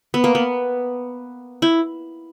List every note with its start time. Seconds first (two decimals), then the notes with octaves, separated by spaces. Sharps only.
0.14 B3
0.24 A#3
0.35 B3
1.62 E4